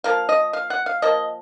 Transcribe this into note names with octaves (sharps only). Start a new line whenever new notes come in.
F3 A#3 F5
D#5
F5
F#5
F5
F3 A#3 D#5